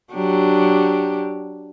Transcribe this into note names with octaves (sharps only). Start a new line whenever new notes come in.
F#3 D4 G4